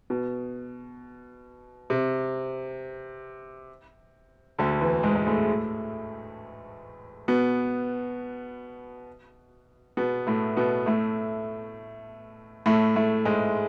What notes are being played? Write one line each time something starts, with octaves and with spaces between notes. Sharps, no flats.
B2
C3
D2 D3
E2 E3
G#2 G#3
G#3
A2 A3
B2 B3
B2 B3
A2 A3
B2 B3
A2 A3
A2 A3
A2 A3
G#2 G#3